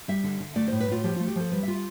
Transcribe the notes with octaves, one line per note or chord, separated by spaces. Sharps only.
G3 E5
D3
D3
A3 D5
A2 C5
B4
A2 F4
F3 G4
A3 F4
G4
F3 A4
G3 B4
F4 E5